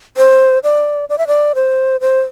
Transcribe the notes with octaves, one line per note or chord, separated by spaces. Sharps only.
C5
D5
D5
E5
D5
C5
C5